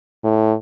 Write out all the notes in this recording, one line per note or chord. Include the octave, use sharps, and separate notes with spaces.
A2